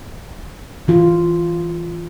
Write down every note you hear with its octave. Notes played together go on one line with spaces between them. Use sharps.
E3 F4